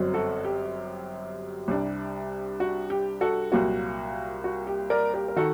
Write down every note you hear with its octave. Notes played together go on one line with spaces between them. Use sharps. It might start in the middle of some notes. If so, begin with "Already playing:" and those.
Already playing: G1 F#2 F#3 C4
F#4 A4
G4
C2 C3 G3 D4
F#4
G4
F#4 A4
C2 A#2 F#3 A#3 F#4
F#4
G4
A#4 D5
G4 A#4
A#4
D#3 F#4 A4